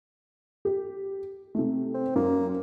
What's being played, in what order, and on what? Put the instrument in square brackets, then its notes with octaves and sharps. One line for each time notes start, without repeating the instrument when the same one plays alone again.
[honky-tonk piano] G4
C3 A3
[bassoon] C4
[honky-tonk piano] F#2 [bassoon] A#3